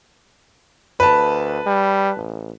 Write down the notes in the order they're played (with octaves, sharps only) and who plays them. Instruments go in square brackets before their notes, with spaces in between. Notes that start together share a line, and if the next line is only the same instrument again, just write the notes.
[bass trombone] D2 [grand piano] B4 A5
[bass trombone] G3
A1